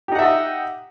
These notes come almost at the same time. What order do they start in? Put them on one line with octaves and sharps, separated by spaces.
G4 D#4 F#5 E5 D#5